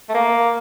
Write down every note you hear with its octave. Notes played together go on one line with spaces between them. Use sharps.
A3
A#3